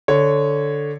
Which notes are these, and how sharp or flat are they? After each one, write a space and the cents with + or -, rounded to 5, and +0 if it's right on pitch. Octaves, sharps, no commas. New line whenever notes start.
D3 +0 C#5 -5